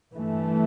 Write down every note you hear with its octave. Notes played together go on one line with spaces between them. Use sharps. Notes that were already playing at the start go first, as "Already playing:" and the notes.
G2 E3 A3